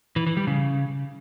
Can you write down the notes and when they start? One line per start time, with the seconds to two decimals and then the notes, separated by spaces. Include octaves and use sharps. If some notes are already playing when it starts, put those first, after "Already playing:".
0.16 E3
0.27 E3
0.37 G3
0.47 C#3